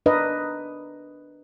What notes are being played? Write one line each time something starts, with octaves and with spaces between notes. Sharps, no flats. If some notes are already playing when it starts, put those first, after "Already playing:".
D4 A#4 B4 D#5